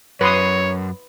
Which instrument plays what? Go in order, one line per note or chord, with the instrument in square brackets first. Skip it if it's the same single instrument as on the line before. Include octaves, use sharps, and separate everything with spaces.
[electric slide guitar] F#2 [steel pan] B4 C6 D#6 [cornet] C#5